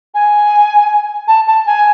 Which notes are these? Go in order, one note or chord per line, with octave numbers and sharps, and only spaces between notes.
G#5
A5
A5
G#5